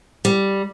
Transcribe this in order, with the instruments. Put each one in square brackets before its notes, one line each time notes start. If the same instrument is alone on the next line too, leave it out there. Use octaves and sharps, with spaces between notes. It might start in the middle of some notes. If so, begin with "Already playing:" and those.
[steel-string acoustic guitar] G3